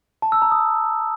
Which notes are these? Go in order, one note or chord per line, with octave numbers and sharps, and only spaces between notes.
A5
E6
A#5
D#6